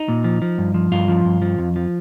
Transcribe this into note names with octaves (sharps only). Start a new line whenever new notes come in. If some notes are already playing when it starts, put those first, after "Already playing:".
Already playing: D#4
A#2
F3
F3
G2
F3
G2 F4
F3
G2
F3
F2
F3